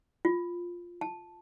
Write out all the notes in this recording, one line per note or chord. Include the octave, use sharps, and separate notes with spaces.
F4
A5